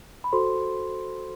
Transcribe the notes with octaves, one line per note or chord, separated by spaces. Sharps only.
B5
F#4 A4 C5 C6